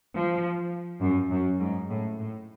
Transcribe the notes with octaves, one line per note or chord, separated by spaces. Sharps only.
F3
F#2
F#2
G#2
A2
A2